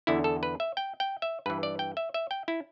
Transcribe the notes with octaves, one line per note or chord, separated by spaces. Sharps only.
E2 D3 E4
A4
B4
E5
G5
G5
E5
G2 E3 B4
D5
G5
E5
E5
G5
E4